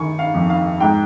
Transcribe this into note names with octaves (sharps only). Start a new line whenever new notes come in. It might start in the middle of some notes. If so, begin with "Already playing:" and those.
Already playing: D#3 G#5 C#6
F5
F2
F5
G#2 G5